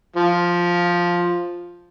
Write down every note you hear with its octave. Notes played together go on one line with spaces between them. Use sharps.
F3